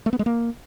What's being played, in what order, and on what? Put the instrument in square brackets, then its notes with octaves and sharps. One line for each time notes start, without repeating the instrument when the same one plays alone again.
[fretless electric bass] A3
B3
G#3
A#3